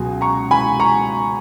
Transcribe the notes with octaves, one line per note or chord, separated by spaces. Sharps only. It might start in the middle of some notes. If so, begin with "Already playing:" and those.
Already playing: C#2 B2 F#3 G#5
A#5 C#6
G#5 B5
A#5 C#6